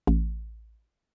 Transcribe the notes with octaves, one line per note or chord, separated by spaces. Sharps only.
A1